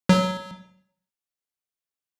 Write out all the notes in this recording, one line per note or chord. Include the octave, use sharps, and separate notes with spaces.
F#3